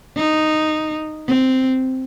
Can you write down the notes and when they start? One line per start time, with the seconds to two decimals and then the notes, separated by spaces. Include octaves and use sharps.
0.16 D#4
1.28 C4